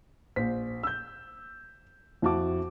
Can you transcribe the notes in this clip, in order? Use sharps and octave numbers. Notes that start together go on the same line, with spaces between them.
A#1 C5 B6
E6 G6
F2 E4 F#4 A5 D6